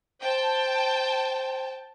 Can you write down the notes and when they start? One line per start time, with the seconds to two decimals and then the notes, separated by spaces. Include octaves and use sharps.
0.22 C5 G5 A5